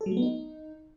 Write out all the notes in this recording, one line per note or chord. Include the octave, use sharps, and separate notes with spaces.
A4
F#3
A3
B3
D#4